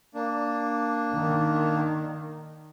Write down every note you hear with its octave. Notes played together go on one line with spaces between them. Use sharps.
A#3 D4
D#3